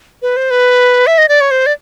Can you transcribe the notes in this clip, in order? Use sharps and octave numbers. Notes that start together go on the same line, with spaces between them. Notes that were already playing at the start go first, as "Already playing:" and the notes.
B4
C5
B4
E5
D#5
D5
C#5
C5
D5